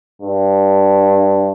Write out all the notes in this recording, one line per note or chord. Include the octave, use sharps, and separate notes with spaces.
G2